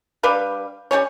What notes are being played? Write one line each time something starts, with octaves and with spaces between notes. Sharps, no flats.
G3 D4 B4 F5
G3 A#3 C#4 C#5